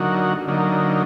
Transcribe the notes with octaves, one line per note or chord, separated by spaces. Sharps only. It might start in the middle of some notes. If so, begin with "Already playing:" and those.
Already playing: D3 F#3 A#3 D#4 F#4
D3 F#3 A#3 D#4